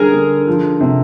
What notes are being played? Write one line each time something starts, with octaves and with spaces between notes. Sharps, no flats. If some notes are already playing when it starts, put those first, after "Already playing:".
Already playing: D3 G3 G#4 A#4
D3
F3
C3